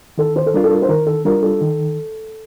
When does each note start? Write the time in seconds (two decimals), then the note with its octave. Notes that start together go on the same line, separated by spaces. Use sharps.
0.18 D#3 A4
0.36 C5
0.46 A4
0.54 G3 D4 F4 A#4
0.64 A4
0.71 A#4
0.82 C5
0.89 D#3 A#4
1.07 A4
1.25 G3 D4 F4 A#4
1.43 A4
1.61 D#3